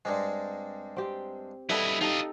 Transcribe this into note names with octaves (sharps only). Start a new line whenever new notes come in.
G2 G3 G#3 C4
C4 G4
G3 E4 A4 B4 D#5 E5 F#5
D#4 F4 G4 A4 D#5